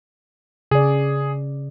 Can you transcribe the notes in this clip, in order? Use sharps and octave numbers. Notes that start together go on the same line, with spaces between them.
C#3 G#4 D5